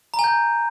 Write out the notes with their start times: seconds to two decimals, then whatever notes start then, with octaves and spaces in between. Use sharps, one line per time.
0.14 A#5
0.19 G#5
0.24 G6